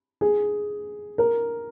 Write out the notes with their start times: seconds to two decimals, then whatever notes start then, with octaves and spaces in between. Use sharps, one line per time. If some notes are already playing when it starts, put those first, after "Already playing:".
0.21 G#4
1.18 A#4